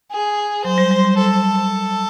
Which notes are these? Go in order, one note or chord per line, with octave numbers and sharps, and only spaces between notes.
G#4
F#3 C5
G3
G3
G3
A4